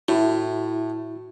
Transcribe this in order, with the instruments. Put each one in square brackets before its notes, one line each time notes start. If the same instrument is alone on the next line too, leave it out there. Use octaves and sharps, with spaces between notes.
[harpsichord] A2 [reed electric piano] E4 [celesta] F#4